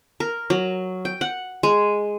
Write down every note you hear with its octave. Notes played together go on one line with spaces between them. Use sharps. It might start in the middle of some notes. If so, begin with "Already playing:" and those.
A#4
F#3
G5
F#5
G#3